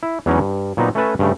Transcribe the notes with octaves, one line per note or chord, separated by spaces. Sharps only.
E4
E2 E3 F#3 G#3 C#4 D#4
G2
A#2 F#3 B3 C4 D#4
A3 C#4 A4 B4 G#5 A5
G2 C#3 A3